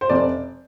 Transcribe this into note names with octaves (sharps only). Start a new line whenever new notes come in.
C5
F1 D5